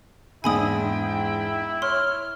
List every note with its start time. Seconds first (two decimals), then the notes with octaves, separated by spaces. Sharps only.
0.44 E2 G#2 D4 E4 G5 G#5 B5 D#6
1.82 C#5 C6 F6